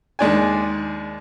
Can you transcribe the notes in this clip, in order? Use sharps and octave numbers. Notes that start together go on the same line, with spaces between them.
D#2 G#3 D4 G#5